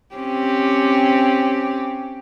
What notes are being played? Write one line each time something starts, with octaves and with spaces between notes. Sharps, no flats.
C4 C#4 G4